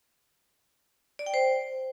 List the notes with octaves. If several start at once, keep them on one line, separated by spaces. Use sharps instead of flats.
D5
G5
C5